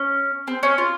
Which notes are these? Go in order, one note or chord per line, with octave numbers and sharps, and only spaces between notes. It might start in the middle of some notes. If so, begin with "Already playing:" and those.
Already playing: C#4
C4
C#4
F4